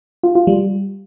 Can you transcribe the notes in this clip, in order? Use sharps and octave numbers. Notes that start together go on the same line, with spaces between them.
F4
F4
G3